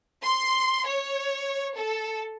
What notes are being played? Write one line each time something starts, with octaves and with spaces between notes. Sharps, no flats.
C6
C#5
A4